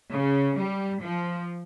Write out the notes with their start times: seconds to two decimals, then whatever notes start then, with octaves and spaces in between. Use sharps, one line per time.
0.10 C#3
0.57 G3
1.01 F3